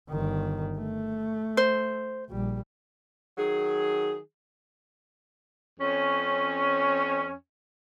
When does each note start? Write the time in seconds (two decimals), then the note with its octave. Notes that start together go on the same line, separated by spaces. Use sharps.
0.11 G1 D#3
0.78 A3
1.57 C5
2.30 A#1 G3
3.38 D#3 F#3 G#4
5.80 F2 C#4